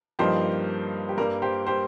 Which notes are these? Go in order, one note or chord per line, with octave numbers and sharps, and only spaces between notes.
G2 F3 A#3 D#4 G4 C5
G4
G2 G3 A#3 A#4
G4 C5
G4 C5